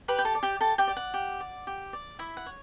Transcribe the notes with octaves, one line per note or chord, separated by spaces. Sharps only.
G4 B4 B5
G5
A4 A5
D5
G4 G5
G4 A4 A5
G4 G5
D5
F#5
G4
D5
G4
D5
E4 E5
F#5
C#5